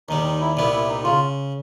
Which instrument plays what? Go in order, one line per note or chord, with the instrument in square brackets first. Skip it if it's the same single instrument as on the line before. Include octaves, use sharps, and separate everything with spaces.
[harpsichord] D#2 D#3 G3 [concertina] D#4
[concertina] D#4
E4
[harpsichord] C2 A#2 G3 B3 [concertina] E4
[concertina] E4
D#4
[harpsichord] C#3 [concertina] F4